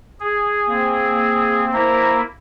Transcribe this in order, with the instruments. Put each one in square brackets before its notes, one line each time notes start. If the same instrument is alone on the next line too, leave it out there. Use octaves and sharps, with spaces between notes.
[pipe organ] G#4
[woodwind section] A#3 C4
[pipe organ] A#3 E4 [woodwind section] C5 A#5